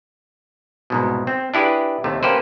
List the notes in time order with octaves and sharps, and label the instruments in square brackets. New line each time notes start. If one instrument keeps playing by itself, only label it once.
[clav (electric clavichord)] C2 G#2 B2
C4
D4 E4 G4 G#4 B4
D#2 C3 A3
A#3 C#4 G4 A4 B4 C5